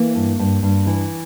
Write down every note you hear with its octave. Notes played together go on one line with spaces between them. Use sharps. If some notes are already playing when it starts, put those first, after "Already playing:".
Already playing: E3 A#3
G2
G2
G2
E3